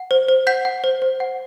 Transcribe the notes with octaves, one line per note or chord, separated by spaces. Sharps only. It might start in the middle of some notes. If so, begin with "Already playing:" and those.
Already playing: F#5
C5
C5
F#5 G6 B6
F#5
C5
C5
F#5